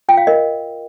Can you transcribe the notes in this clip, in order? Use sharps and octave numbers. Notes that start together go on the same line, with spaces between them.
F4 G5
F5
A#4 D#5